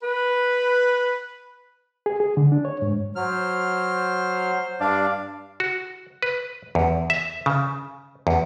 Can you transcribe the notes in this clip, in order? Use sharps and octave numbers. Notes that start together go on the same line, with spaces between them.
B4
G#4
G#4
D3
D4
C#5
G#2
F#3 C5 F6
G2 D4 D5 F5
F#4
B4
E2
E5
C#3
E2